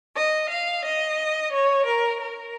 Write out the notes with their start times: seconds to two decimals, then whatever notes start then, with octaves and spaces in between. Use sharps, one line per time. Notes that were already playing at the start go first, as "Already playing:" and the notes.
0.16 D#5
0.50 F5
0.85 D#5
1.53 C#5
1.87 A#4
2.22 A#4